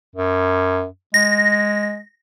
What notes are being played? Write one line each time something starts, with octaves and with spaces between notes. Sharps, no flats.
F#2
G#3 A#6